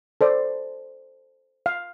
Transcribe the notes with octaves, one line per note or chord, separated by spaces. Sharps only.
A4 C5 D5
F5